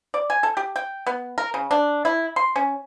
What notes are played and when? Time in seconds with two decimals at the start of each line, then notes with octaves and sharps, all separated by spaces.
0.14 D5
0.30 G#5
0.43 A4
0.57 G4
0.76 G5
1.07 B3
1.38 A#4
1.54 C#3
1.71 D4
2.05 E4
2.36 C6
2.56 C#4